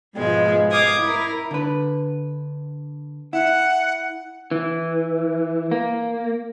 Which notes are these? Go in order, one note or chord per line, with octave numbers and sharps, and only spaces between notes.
G#2 B2 F3 G#3
F5 D6 D#6 G#6
E4 A#4
D3 B4
E4 F#5
E3
A#3